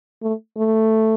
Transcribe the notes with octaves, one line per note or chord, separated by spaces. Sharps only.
A3
A3